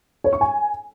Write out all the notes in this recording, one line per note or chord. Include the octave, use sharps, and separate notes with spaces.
C#5
C#6
G#5